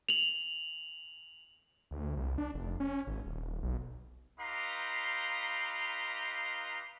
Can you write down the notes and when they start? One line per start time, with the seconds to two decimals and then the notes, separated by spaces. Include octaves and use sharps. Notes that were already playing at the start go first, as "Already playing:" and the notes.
0.09 F7 F#7
1.91 D2
2.17 C2
2.38 D4
2.54 F1
2.80 C#4
3.07 G#1
3.26 D#1
3.62 B1
4.40 D#4 G4 B4 F5 A#5 C6